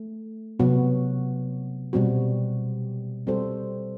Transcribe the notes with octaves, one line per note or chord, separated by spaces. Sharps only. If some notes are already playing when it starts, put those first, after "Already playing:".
Already playing: A3
C3 F#3 B3 F#4
B2 G3 C4 F#4
G3 C4 F#4 A4 C5